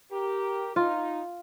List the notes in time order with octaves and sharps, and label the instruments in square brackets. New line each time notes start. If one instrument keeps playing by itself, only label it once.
[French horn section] G4 A#4
[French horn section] D#4 [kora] F4